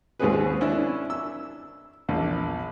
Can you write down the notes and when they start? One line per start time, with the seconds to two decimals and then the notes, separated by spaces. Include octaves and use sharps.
0.20 D#2 G#2 C4 C#4 G#4 B4
0.61 C#4 D4 E4
1.10 E6
2.09 A#1 E2